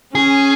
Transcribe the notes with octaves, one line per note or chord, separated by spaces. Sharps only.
C#4 G#4